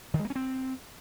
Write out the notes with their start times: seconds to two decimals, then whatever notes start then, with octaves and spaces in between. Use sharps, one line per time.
0.14 D#3
0.19 G#3
0.25 A#3
0.30 C#4
0.35 C4